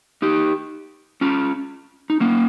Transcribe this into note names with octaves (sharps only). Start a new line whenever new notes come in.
D#4 G4
C#4 F4
D#4
A#3 C#4